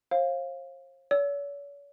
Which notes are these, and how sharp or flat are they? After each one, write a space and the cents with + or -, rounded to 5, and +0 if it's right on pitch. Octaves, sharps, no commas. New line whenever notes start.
C5 +40 F5 +0
C#5 +40 E6 +0